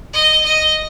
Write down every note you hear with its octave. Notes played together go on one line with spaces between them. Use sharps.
D#5
D#5